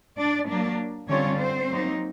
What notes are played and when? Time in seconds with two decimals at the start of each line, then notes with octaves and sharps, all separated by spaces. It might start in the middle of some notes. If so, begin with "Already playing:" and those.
0.17 D4 D5
0.48 F#3 A#3 D4
1.08 D3 G3 C4 C#4 F4 C#5
1.38 C4 C5
1.69 F#3 A#3 D#4